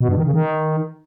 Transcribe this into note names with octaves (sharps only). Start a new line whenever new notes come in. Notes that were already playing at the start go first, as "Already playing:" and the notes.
B2
G2
D#3
C#3
D#3